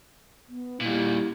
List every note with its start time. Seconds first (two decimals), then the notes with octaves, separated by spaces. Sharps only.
0.48 B3
0.81 A#2 G3 E4